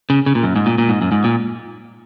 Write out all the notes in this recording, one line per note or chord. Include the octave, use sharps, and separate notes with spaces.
C#3
C#3
A#2
F#2
G#2
A#2
A#2
G#2
F#2
G#2
A#2